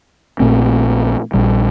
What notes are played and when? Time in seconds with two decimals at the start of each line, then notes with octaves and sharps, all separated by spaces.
0.40 A#1 A#2 A3 C4
1.34 A#1 A#2 G3